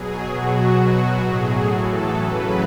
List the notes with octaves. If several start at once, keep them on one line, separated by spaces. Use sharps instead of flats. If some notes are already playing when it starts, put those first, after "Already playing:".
Already playing: B2 F#3 G#4
B2 F#3 F#4
B2 F#3 F#4
A2 F#3 G#4
A2 E3 A4
C#3 F#3 B4